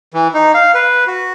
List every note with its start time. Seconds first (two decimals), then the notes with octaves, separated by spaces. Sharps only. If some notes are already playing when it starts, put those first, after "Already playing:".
0.14 E3
0.34 D#4
0.54 F5
0.75 B4
1.07 F#4